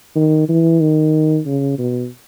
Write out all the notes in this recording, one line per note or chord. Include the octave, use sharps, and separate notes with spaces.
D#3
E3
D#3
C#3
B2